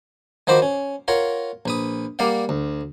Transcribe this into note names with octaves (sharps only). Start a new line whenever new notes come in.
D#3 F3 F#4 C5 B5 D6
C#4
F4 A#4 C#5 F#5
A#1 B4 D#6
G3 A#3 D5 F5 F#5
D2